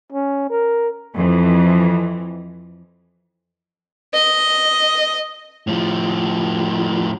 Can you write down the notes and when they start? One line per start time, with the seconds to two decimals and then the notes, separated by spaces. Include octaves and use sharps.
0.13 C#4
0.50 A#4
1.15 F2 E3
4.14 D#5
5.67 A2 F3